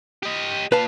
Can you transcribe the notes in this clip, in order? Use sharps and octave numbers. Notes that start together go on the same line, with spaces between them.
G4 D#5
A#2 B4 F5 A5